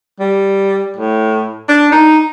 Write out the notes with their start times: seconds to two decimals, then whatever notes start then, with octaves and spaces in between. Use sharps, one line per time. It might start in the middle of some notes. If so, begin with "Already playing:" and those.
0.20 G3
0.96 A2
1.69 D4
1.92 D#4